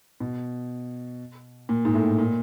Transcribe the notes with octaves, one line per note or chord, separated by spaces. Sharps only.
B2
A#2
G#2
A2
A#2